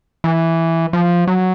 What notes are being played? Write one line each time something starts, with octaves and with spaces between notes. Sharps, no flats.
E3
F3
F#3